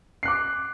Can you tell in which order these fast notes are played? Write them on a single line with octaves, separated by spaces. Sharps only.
C7 F#6 D6